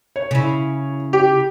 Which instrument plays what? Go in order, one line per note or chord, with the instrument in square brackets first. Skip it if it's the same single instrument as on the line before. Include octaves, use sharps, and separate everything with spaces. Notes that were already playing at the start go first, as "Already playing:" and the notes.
[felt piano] C#5
[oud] C#3 E4
[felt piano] G4